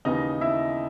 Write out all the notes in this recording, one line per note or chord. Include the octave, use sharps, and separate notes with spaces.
D#2 C#3 E3 D#4 D#5
E4 E5